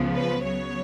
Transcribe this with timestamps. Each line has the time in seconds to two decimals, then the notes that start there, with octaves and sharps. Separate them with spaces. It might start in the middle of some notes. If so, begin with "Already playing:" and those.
Already playing: C#2 C#3 F3 B3
0.15 B4
0.45 C#3 F#3 B3 C#5